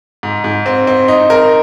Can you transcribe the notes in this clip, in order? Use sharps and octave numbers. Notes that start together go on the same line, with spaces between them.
G#2
G#2
C4
C4
D#4
A#4